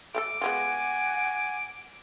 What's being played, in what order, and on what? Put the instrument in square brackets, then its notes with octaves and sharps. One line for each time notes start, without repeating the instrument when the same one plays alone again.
[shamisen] A3 G4 A4 [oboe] D6
[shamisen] G#3 B3 F4 [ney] F#5 [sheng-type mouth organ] G#5